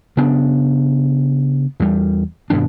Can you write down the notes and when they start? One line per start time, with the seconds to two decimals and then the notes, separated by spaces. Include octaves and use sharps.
0.17 C#3 B3 D4
1.80 E2 G3
2.50 G2 B2 D#3 D4